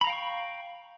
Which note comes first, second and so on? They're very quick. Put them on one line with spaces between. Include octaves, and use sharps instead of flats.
B5 A#5 F5 G5 C#6